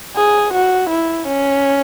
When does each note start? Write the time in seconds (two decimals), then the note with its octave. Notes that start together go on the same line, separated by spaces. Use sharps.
0.17 G#4
0.53 F#4
0.90 E4
1.27 C#4